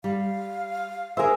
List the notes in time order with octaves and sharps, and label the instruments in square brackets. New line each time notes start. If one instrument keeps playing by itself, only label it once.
[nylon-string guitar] G3 [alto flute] F5
[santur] G#4 E5 [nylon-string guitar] A#4 C5